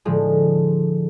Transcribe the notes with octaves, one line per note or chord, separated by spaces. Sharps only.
A2 D3 F3 G#3